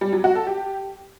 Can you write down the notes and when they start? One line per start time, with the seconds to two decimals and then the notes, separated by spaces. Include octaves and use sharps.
0.01 G3
0.13 F#3
0.24 F#4
0.35 A4
0.47 G4